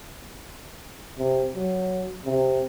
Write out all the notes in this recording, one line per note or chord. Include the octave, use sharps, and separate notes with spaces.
C3
F#3
C3